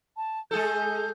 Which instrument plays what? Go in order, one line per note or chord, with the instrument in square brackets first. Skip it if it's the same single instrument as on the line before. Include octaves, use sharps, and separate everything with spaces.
[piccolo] A5
[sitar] G#3 G#4 A4 [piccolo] G6